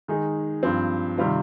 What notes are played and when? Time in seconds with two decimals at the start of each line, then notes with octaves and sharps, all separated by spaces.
0.08 D#3 G#3 D#4 G#4
0.63 G2 F3 C4
1.18 C3 D#3 G3 C4 F4